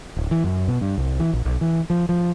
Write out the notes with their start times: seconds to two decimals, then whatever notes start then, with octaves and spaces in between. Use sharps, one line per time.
0.17 D1
0.31 E3
0.44 F#2
0.68 B2
0.81 G2
0.98 C2
1.20 E3
1.33 A#1
1.45 B1
1.61 E3
1.90 F3
2.09 F3